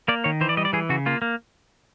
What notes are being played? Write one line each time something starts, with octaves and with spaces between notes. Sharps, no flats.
A#3 D5
D#3 C#5
E3 C5
D5
G3 D#5
D5
E3 G#4
C#3 F#4
A#3 F4
A#3